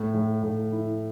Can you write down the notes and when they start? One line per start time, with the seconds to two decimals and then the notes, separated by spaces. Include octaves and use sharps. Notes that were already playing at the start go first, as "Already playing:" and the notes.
Already playing: A2
0.14 A2
0.43 A2
0.72 E4